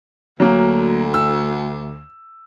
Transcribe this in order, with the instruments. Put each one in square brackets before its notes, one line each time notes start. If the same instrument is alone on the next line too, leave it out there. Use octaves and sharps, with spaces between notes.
[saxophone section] D2 [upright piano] F#3 A#3
[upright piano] E6